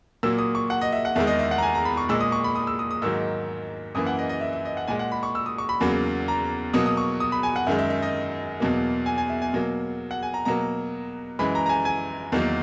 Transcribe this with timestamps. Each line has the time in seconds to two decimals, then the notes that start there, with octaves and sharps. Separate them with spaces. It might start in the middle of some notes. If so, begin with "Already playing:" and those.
0.23 A#2 F#3 A#3 E6
0.38 D#6
0.55 C#6
0.70 F#5
0.81 D#5
0.92 E5
1.05 F#5
1.16 E2 D#3 G#3 E5
1.27 D#5
1.39 E5
1.51 F#5
1.58 A#5
1.63 G#5
1.75 A#5
1.85 B5
1.97 C#6
2.09 A#2 G#3 E6
2.21 D#6
2.32 C#6
2.44 B5
2.56 D#6
2.67 E6
2.79 D#6
2.91 D#6
3.02 G#2 D#3 F#3 A#3 E6
3.95 F#2 E3 A#3 D#6
4.07 F#5
4.18 D#5
4.29 D#5
4.41 E5
4.53 E5
4.65 D#5
4.77 F#5
4.87 A#2 G#3 G#5
4.99 F#5
5.12 B5
5.23 C#6
5.35 E6
5.46 D#6
5.58 C#6
5.69 B5
5.81 E2 C#3 F#3 A#3
6.28 A#5
6.73 B2 F#3 A#3 D#6
6.86 D#6
6.97 C#6
7.20 D#6
7.32 B5
7.43 G#5
7.56 F#5
7.67 F#2 D#3 G#3 E5
7.79 E5
7.90 E5
8.03 D#5
8.60 E2 B2 F#3 A#3
9.06 G#5
9.18 G#5
9.30 E5
9.42 G#5
9.53 B2 F#3 A#3
10.11 F#5
10.23 G#5
10.34 A#5
10.45 B2 F#3 A#3 A#5
11.39 F#2 E3 G#3 B5
11.55 A#5
11.66 A#5
11.69 G#5
11.85 G#5
12.32 E2 D#3 F#3 A#3